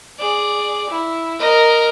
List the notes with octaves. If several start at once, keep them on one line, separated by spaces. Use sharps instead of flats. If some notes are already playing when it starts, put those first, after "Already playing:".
G#4 D5
E4
A#4 D#5